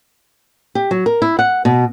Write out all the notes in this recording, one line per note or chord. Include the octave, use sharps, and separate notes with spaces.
G4
F#3
A#4
E4
F#5
B2